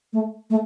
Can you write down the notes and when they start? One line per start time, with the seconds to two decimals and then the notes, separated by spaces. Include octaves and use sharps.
0.13 A3
0.50 A3